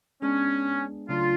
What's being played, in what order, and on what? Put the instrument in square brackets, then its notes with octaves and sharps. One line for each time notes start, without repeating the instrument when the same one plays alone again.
[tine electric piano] G#3 B3 D4 G#4 [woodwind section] C#4
[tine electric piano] C#3 F#3 A3 D4 [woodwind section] F4